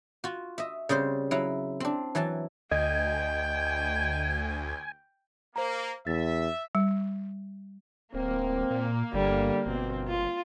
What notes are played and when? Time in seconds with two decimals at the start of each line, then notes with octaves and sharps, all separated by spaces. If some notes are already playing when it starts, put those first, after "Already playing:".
0.24 F4 F#4
0.58 D#5 E5
0.89 C#3 G3 C4 C5
1.31 F#3 E4 F5
1.80 C4 D4
2.15 E3 F#3 G#5 A5
2.71 D2 D#5 G5 G#5
5.56 A#3 C5 A#5
6.07 E2 E5 A6
6.75 G3
8.14 D1 A#3 C4
8.71 A#2
9.13 G1 D3 G3
9.66 G1 B2 C4
10.08 F4